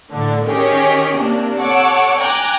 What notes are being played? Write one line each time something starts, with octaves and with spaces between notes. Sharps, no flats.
A2 D3
D#3 C#4 G4 G#4 C#5
C3 A#3 D4
A4 C#5 F#5 D6
G5 G#5 A#5 D6 F#6